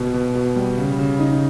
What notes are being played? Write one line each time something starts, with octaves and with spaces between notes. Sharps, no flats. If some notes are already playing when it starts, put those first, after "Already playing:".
Already playing: B2
B2
B2
G3
C#3
C#3
D#4